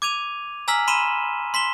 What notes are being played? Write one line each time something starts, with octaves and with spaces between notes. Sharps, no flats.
D6 G#6 D#7 F7
G#5 A#5 E6 F6 B6 F#7
B5 C6 D#7 E7 G7
C6 B6 E7 G7